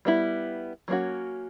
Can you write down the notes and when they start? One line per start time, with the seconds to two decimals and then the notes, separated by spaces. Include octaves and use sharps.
0.05 G3 B3 E4
0.88 F#3 A#3 C#4 F#4